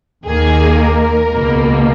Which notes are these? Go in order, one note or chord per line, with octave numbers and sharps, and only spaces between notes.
D#2 D#3 A#3 G#4
A#4
C#2 B2 A#3